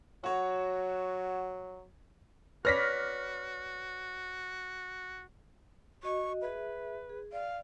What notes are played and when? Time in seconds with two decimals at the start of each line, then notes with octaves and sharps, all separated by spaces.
0.24 F#3 F#4 C#5
2.65 F#4 B4 C#5 D5 F6 A#6 B6
6.03 F#4 D#5 C#6
6.42 G#4 B4 E5
7.09 G#4
7.32 D5 F5